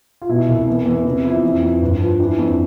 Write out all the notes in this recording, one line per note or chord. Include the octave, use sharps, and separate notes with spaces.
F4
B2 E4
C2
E2
E2
C3
F3 E4
F2
F2
G2
F3
E3 D4
F2